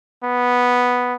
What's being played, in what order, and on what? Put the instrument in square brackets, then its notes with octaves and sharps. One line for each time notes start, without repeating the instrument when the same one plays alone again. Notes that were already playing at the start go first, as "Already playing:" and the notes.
[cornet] B3